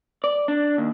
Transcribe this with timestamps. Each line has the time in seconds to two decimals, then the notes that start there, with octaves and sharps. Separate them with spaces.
0.24 D5
0.48 D4
0.78 D#2